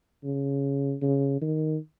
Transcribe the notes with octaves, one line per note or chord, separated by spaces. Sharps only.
C#3
C#3
D#3